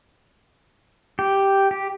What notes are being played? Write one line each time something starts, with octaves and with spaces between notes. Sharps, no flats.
G4
G4